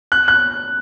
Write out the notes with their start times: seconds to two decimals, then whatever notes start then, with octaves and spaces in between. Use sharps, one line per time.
0.12 F#6
0.28 F#6